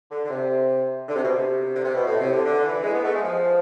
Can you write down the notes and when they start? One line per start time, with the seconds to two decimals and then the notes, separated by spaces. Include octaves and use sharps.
0.10 D3
0.25 D3
0.29 C3
1.07 D3
1.15 C3
1.22 B2
1.29 C3
1.73 D3
1.84 C3
1.95 B2
2.06 A2
2.19 C3
2.32 D3
2.45 D3
2.64 E3
2.84 G#3
2.94 B3
3.04 A3
3.14 G#3
3.23 F3